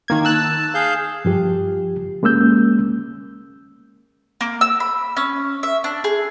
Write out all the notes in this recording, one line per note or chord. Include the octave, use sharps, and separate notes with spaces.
D#3 A#3 G#6
A5 E6 F#6
G#4 F5 G6
G2 F3 G4
G#3 A#3 C#4 E6 G6
A#3
E6
B5
C#4
E5
D4
G#4